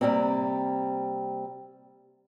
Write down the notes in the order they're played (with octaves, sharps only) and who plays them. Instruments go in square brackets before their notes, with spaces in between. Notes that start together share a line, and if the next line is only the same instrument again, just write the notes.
[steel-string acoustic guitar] C3 F3 G3 A#3 C4